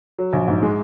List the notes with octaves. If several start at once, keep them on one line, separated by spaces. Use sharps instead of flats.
F#3
A#1
G#2
G#3